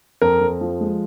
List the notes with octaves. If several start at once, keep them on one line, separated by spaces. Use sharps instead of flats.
F2 A#4
F2
F3
G#3